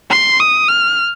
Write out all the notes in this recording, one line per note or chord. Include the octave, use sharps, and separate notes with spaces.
C6
D#6
F6